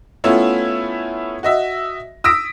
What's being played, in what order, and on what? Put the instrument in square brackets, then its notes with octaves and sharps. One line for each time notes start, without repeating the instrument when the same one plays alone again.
[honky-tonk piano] A3 B3 C#4 E4 F4
F#4 D#5 E5
D#6 E6 A#6 B6 D7